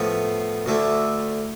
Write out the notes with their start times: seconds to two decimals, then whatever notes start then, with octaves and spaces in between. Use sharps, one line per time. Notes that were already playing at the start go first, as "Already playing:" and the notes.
Already playing: A2 F3 B3
0.66 D2 D3 A3 E4